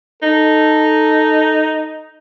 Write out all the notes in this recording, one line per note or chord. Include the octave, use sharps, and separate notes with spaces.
D#4 A4